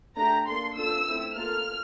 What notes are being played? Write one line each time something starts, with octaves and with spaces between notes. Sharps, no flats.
A3 D4 G4 A#5
A#3 D4 A4 C6
D4 F4 A4 E6
A3 C4 E4
A#3 F4 A4 F6